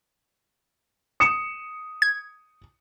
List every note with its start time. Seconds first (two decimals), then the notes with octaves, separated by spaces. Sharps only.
1.20 D#6 C#7 E7
2.02 G#6